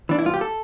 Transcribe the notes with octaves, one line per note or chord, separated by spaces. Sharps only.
E3 D4
E4
G2 F4
G4
A4